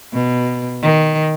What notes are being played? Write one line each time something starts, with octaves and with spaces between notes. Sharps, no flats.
B2
D#3